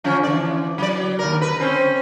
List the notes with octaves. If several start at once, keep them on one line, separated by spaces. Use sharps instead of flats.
D3 F3 C#4
E3 D5
F#3 D5
D#2 A#4
B4
C4 C#4 C5